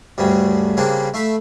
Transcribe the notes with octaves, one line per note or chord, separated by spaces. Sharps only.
D2 G2 C#3 G3
C#3 G3 A#3 C4 D4
A3 E5 F5 B5